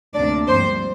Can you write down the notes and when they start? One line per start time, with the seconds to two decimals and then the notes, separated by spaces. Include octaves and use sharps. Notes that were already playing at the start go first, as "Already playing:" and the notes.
0.15 D2 C3 A#3 D4 D5
0.48 G2 F3 C4 C5